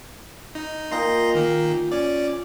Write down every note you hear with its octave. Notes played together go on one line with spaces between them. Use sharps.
D#4
A#2 D#5 G5 A#5 C6
D#3 A#3
C#4 D5